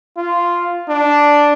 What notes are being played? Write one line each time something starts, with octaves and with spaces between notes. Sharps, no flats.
F4
D4